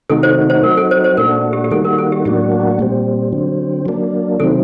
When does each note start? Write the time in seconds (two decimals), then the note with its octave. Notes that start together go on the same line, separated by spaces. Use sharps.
0.10 C3 D#3 A3 D#4 F#4 A4
0.23 C5
0.50 C5
0.63 F#3 C4 D#4 F#4 A#4
0.77 A4
0.91 C5
1.04 C5
1.17 A#2 A3 D4 F#4 A#4
1.53 G4
1.64 G4
1.71 D#3 G3 A#3 F#4 A4
1.85 A#4
1.98 A4
2.12 G4
2.25 A2 F#3 A#3 D4 F#4 G4
2.79 A#2 G3 C4
3.32 D3 F#3 C4
3.86 F#3 A#3 D4
4.40 C3 D#3 F#3 A3 C4 A4